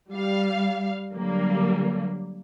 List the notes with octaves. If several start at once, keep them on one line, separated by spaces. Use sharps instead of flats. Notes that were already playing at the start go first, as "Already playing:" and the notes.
G3 F5
D3 F#3 G3 A#3